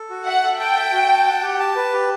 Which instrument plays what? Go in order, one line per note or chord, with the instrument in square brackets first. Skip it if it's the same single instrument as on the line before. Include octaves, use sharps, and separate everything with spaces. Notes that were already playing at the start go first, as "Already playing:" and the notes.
Already playing: [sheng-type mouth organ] A4
F#4
[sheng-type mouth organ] E5 [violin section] F#5
[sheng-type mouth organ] A4
[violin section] G5 [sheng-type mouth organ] A5
[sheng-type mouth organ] E5
F#4
A5
F#5
G4
A5
B4
G4